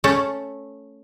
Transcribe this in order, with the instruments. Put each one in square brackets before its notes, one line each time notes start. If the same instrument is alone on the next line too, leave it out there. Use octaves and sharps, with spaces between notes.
[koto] A3 C#4 A4